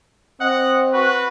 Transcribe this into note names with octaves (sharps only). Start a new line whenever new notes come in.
C4 D#5 F#5
F#4 B4